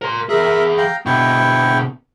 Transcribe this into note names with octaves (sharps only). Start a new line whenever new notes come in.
A#4 C6
E3 G#4 A#4 E5
F5 G5 A#5
B2 D3 E4 G5 C#6